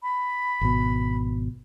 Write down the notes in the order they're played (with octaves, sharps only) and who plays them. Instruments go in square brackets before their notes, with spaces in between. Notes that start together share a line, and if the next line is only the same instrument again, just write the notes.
[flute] B5
[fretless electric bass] G#1 B2